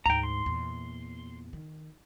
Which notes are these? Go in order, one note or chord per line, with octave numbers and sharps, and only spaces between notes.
D2 G#2 G5 A#5
C6
E2 A#2
D#3